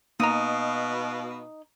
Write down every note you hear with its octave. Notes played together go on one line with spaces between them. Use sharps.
B2 A#3 D#4 F5 A#5